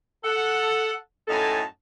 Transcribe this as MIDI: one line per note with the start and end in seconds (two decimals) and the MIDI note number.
0.24 0.93 69
0.24 0.93 78
1.27 1.62 42
1.27 1.62 45
1.27 1.62 63
1.27 1.62 69
1.27 1.62 80
1.27 1.62 81